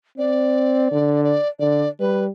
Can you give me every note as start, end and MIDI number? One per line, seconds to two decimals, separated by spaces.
0.18 0.88 60
0.18 1.21 74
0.91 1.36 50
1.24 1.48 74
1.59 1.87 50
1.59 1.89 74
2.00 2.30 55
2.00 2.25 71